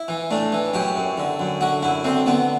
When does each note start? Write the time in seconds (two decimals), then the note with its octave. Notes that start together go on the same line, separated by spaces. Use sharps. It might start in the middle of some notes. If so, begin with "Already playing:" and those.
Already playing: E4
0.08 E3
0.31 A2 D4
0.52 E3
0.74 F#2 G4
0.95 F#2
1.18 D3
1.40 F#2
1.61 D3 F#4
1.82 F#2 E4
2.04 D3 C4
2.26 D3 B3